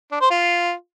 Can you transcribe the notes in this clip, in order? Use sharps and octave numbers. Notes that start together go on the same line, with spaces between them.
D4
C5
F4